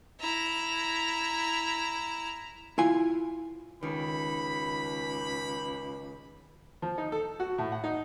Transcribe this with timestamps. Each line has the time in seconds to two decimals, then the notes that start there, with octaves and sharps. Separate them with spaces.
0.20 E4 A#5
2.78 E4 F4 G#5
3.83 C#2 D#3 B5
6.82 F3
6.98 D#4
7.12 A4
7.40 F#4
7.58 A2
7.72 F#5
7.84 D#4